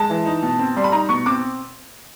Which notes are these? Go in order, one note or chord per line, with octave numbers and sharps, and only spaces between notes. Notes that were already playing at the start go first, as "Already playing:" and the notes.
Already playing: G#3 A5
E3
D#4
B2
C4
G3 C6
B5
D#4 A#5
B2 C#6
C4 D6